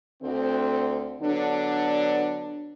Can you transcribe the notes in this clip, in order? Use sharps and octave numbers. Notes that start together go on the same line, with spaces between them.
D2 C4
D3 F#3 B3 D4